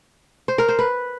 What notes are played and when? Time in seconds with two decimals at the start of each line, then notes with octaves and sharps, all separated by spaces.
0.48 C5
0.58 A#4
0.69 C5
0.79 B4